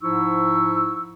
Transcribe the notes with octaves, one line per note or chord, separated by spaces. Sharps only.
G#2 F3 D#4 E4 C#6 E6